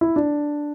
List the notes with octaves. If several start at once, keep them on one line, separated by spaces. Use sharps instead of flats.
E4
D4